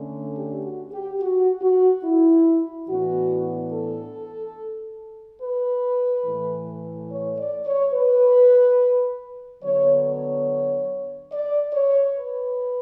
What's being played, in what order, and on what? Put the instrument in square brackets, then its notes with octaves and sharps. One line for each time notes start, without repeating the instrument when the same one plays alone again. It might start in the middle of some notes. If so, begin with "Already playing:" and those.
Already playing: [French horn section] D3 A3 C#4
G4
F#4
G4
F#4
F#4
E4
A2 E3 B3 D4 F#4
A4
B4
A2 E3 A3
C#5
D5
C#5
B4
D3 F#3 B3 C#5
C#5
D5
C#5
B4